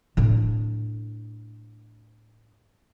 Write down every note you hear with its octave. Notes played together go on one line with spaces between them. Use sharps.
A2 D4